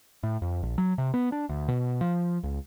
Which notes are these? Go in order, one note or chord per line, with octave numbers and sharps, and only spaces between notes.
A2
F2
A#1
F#3
C3
B3
D4
D2
B2
F3
C#2